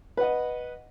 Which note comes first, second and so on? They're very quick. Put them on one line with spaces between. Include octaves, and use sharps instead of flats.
B4 F#5 D#5